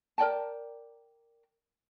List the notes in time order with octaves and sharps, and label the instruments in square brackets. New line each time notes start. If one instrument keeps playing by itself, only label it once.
[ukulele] A#4 D5 G5 A5